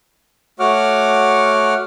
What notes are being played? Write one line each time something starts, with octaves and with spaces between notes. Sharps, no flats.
A3 F#4 C#5 F#5 D6 F6